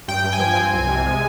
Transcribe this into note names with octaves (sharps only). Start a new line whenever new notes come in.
G2 G5
G2
G#5
F3
C4
C2
C3
G#3